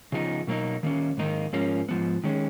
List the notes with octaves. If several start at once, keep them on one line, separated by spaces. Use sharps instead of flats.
C#3 F3 B3 D#4
B2 F#3 A#3 D#4
D#3 A#3 C#4
G#2 D#3 A#3 D#4
G#2 F3 A#3 C#4
G#2 F3 B3
D#3 G#3 C#4